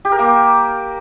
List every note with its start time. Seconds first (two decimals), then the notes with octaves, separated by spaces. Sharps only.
0.05 G4
0.12 A#4
0.19 A#3